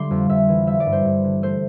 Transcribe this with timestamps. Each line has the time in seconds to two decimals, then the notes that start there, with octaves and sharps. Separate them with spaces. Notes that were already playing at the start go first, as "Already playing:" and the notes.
Already playing: D3 G3 A3 C6 D6
0.11 F2
0.30 F2 E5
0.49 E3
0.67 G3 E5
0.80 D5
0.86 G2
0.92 C5
1.05 G2
1.24 D3
1.43 A3 C5